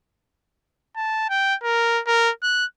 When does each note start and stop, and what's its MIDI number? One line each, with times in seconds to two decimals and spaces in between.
0.96 1.26 81
1.30 1.55 79
1.63 2.01 70
2.07 2.31 70
2.43 2.66 90